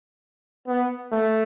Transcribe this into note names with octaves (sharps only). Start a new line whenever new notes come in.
B3
A3